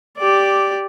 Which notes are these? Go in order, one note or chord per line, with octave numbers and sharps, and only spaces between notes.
G4 D5